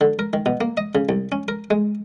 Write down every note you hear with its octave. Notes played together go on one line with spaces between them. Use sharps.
D3
A#4
D#3
B2
A#3
D#5
C#3
C2
C#4
A#4
G#3